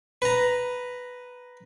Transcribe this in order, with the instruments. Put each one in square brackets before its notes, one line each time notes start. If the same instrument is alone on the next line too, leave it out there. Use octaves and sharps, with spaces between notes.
[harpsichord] B4 A#5